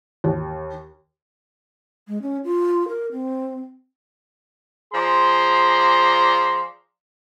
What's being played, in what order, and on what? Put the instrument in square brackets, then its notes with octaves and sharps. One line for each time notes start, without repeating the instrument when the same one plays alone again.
[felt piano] D#2
[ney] G#3
C#4
F4
A#4
C4
[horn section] F3 G#4 D5 A#5 C6